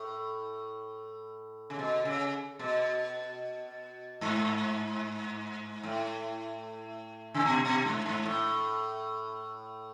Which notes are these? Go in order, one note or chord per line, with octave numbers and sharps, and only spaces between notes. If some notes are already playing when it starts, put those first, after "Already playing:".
Already playing: A2
C#3
B2
C#3
B2
G#2
A2
C#3
B2
B2
G#2
G#2
A2